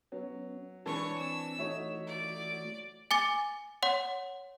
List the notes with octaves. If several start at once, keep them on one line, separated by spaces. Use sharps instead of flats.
F#3 B3 C#4
E3 G#3 D4 C#5 A5 C#6
C4 E6
E3 A3 D#4 F#4 C#5 E5
D5
G#5 D6 A6
C#5 F#5 C6